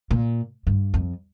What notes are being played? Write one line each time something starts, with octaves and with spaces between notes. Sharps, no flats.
A#2
G2
F2